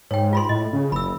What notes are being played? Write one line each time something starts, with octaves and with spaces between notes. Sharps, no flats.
G#2 C#5 G5
F4 B5 C6
A2 D#5
C#3
F#1 B5 E6